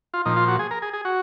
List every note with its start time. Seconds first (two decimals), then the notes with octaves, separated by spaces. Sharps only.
0.14 F4
0.25 A#2 F3 D#4
0.36 F4
0.48 F#4
0.59 G#4
0.71 A#4
0.82 G#4
0.93 G#4
1.05 F#4